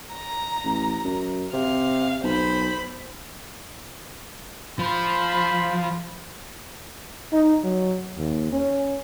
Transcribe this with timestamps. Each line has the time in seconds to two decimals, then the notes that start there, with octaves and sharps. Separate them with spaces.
0.13 A#5
0.64 A1
1.04 F#2
1.53 C3 F5
2.24 B1 C5 B5
4.79 F3 F4 C5 B5
7.32 D#4
7.64 F#3
8.17 D#2
8.52 C#4